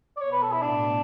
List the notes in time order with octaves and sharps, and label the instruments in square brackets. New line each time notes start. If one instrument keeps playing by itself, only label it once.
[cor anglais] D5
[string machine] B2 B3 [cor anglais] C#5
[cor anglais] B4
A4
E4
[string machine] A2 A3 [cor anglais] D4